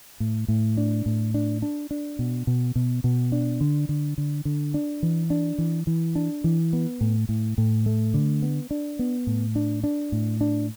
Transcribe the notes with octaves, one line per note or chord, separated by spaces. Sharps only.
A2
A2
D4
A2
D4
D4
D4
B2
B2
B2
B2
D4
D3
D3
D3
D3
D4
E3
D4
E3
E3
D4
E3
B3
A2
A2
A2
A3
D3
B3
D4
B3
A2
D4
D4
A2
D4